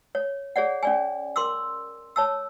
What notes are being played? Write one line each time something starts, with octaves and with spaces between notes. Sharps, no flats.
C#5
G#4 C#5 D5 F#5
C#4 D5 G#5
A#4 C6 D6 E6
C#5 A5 E6